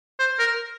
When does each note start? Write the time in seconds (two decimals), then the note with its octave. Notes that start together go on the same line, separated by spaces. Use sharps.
0.19 C5
0.39 A#4